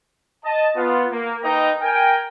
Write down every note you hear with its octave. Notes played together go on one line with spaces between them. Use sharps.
D#5 A5
B3 F4
A#3
A#3 D#4 B4 D#5 G5 A#5
A#4 G5 G#5